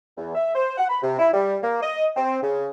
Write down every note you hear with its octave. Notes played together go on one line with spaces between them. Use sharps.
E2
E5
C5
F#5
B5
C3
E4
G3
A#3
D#5
C4
C#3